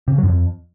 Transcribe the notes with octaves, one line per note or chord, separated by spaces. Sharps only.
C3
C#3
F#3
F#2
F2